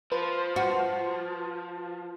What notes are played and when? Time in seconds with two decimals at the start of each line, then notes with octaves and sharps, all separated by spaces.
0.12 F3 B4 C5
0.56 F#4